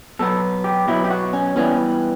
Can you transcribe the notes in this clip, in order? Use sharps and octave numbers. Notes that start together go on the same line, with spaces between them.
B2 F#3 B3 A4
G4
B2 F#3 B3 E4
G4
F#4
C#4
E3 G3 B3 C#4